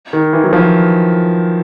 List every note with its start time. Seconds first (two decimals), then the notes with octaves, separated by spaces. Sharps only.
0.13 D#3
0.33 E3
0.44 F#3
0.53 F3